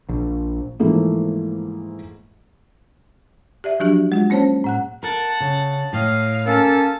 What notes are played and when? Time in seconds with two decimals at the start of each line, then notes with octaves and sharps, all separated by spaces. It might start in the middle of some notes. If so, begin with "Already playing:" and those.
0.09 A#1
0.80 G#2 E3 F3 A3 A#3
3.64 G4 D5 E5
3.80 F3 F#3 D4 F#4 G4
4.12 G#3 F4
4.30 A#3 C#4 C5 C#5 A5
4.64 A2 F#5 F#6
5.03 A#4 F#5 A5
5.40 C#3
5.93 A2 D#5 F5
6.46 A#3 C#4 A4 A5